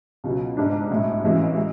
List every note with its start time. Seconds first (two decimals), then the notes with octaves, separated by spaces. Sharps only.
0.24 C#2 B2 F#3
0.57 G#2 G#3 D4
0.90 B1 A2 G#3
1.23 G#1 F#2 E3 G#3
1.57 G#3